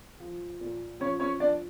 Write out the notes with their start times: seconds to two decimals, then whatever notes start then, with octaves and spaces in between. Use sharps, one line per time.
0.20 F3
0.61 A#2
1.00 F3 C#4 C#5
1.20 C#4 C#5
1.40 F3 D4 D5